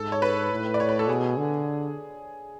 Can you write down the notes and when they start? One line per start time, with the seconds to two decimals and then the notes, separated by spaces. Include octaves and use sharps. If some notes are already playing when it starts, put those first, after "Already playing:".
Already playing: G#2 A4
0.12 C#5
0.22 B4
0.51 A2
0.74 D5
0.80 C#5
0.89 B4
0.99 A4
1.09 B2 G#4
1.37 D3